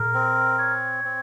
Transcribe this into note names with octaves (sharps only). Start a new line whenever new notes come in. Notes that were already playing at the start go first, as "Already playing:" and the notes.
Already playing: A#2 A#4
C4
C#5
C4